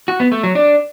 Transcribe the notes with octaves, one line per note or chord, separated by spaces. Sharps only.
F#4
B3
A3
F#3
D4